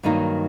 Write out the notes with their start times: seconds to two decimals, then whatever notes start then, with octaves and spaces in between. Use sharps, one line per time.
0.03 G2 D#3 F#3 A#3 D#4